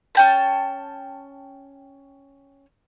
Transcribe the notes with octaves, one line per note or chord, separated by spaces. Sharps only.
C#4 G5 A5